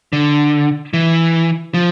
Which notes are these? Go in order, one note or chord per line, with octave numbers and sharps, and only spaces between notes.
D3
E3
F3